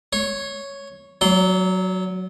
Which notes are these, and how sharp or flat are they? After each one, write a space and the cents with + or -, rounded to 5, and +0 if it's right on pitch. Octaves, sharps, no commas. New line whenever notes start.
C#5 +0 C#6 -40
F#3 +0 D5 -45 C6 -10